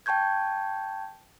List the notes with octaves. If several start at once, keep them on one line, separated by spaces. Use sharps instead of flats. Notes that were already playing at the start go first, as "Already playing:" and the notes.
G5 A5 C#6 G6 G#6